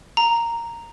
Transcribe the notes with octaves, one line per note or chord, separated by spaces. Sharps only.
A#5